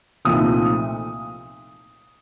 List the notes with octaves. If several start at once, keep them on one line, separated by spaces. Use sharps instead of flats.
C2 A#2 F3 A3 D#4 D#6